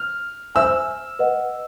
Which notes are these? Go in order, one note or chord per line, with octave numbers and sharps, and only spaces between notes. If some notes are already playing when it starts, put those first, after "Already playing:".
Already playing: F6
C5 E5 G#5 E6
B4 D#5 F#5